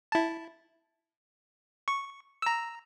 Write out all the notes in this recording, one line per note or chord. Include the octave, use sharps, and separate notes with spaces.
E4 A5
C#6
A#5 E6